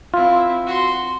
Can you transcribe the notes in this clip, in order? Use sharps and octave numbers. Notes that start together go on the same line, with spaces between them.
C4 E4 F4
F#4 C6